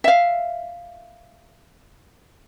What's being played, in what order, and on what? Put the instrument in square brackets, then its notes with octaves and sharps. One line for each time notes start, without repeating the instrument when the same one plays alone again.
[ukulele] E5 F5